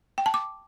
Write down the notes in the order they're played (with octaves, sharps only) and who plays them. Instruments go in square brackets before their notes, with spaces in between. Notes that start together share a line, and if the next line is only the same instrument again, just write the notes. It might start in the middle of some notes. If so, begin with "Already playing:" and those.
[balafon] G5
A5
D6